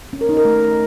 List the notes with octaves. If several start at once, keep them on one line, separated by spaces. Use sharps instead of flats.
C#4
A#4
D#4
A#4
A3